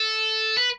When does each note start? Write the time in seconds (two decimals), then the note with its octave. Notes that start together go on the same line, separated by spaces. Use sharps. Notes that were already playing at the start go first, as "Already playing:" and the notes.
Already playing: A4
0.57 B4